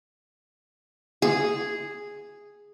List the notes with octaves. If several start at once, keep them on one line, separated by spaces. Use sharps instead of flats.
G#4